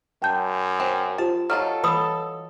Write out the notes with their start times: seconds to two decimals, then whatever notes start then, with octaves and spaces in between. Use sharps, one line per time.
0.22 F#2 G5 A5 G6
0.80 C4
1.18 F4 G4 C5 A5
1.50 F#3 D#4 F4 A4 F6
1.84 E3 B4 B5 D#6